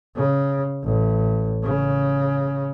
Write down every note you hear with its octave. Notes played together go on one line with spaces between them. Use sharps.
C#3
A1
C#3